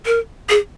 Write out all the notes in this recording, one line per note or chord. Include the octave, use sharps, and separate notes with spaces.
A#4
G#4